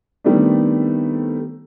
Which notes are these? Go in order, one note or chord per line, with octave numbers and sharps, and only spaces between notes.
D#3 G3 A3 B3 C4 D4